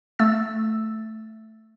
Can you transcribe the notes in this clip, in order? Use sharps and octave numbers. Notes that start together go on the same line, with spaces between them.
A3 E6 A6